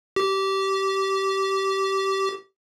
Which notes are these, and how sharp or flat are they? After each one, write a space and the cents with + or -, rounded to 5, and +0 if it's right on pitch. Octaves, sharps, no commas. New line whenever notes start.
G4 -20